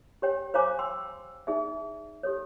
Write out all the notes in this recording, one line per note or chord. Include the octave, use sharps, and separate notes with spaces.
G4 C#5 G5
C5 C#5 F5 G#5 A#5 D6
G5 C6 E6
D#4 G#4 D5 E5
G4 A4 C#5